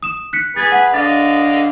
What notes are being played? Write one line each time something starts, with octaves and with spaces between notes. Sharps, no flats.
D#6 E7
F#6 B6 C#7
G#4 B4 G#6 A6
F#5 B6
D3 D#5 F5 A6